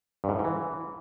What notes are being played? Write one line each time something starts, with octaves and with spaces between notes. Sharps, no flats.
G2
G#2
A2
G#2
E3